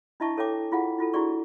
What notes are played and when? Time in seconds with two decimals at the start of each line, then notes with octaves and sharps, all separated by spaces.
0.20 D4 E4 D#5 E5 A5 C#6
0.38 A4 C#5 E5 G5 D6
0.72 E4 F4 G#4 F5 F#5
0.98 E4 F4 A4
1.14 D4 E4 F#4 G#4 D5 C#6